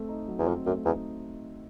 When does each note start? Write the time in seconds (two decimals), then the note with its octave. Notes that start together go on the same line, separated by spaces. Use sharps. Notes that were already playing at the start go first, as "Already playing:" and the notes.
Already playing: A3 C4
0.09 D#4
0.28 F#3
0.39 E2
0.47 F2 C4
0.66 F#2 A3
0.85 E2 D#4